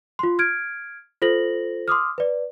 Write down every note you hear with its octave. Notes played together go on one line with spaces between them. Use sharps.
F4 C6
F6 G#6 D7
F4 A4 C5 A#6 F#7
C6 D6 D#6 F6
B4 D5